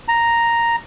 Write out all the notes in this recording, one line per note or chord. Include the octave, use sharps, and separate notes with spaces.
A#5